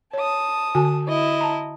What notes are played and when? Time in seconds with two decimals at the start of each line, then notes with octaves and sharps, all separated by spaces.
0.13 C#5 A5 D#6
0.75 D3 F#4 G#5
1.07 E4 D#5
1.41 A5 A#5